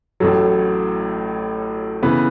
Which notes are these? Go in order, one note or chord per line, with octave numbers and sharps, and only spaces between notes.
A1 A2 F#3 A4
C#3 E3 B3 B4